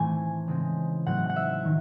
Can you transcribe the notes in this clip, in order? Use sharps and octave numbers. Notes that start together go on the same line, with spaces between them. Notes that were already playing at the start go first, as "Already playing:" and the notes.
Already playing: A2 E3 A3 C4 G#5
C#3 G#3 C4
A2 F#3 C4 F#5
F#5
E5
D#3 F#3